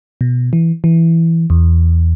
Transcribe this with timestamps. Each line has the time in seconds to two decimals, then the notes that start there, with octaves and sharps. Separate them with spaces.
0.21 B2
0.53 E3
0.84 E3
1.50 E2